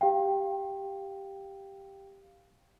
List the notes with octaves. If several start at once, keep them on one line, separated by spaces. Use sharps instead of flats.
G4 F5 G5